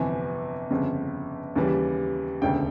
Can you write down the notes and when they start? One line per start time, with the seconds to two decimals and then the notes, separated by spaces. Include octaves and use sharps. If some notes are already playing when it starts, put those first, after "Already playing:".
Already playing: G1 F2 C3 E3 G#5
0.70 G1 F2 C#3
1.56 D#2 C#3 E3 G3
2.42 E1 D2 C#3 G5